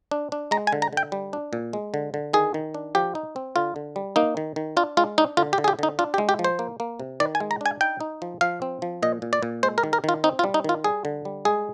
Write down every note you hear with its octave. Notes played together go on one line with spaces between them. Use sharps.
D4
D4
G#3 A#5
G#5
D3
A#5
D3 G5
G3
D4
A#2
G#3
D3
D3
D#3 G#4
D#3
D4
F3 G4
D#4
C4
D3 F4
D3
G3
A#3 D#4
D#3
D#3
D4 F4
G#3 F4
D4 D#4
D3 F4
G4
D3
G#4
G4
D3 D#4
D4 F4
G4
G#3
G4
F3
C5
A#3
A#3
C3
D#3 D5
G#5
G#3
A#5
D4 G#5
D#4 G5
D#4
F3
F3 F5
C4
F3
A#2 D#5
A#2
D5
A#2
G#3 C5
A#4
D#3
A#4
D#3 F4
C4 D#4
F4
G3
D#4
D#3 F4
G3 G#4
D3
G3
G#3 G#4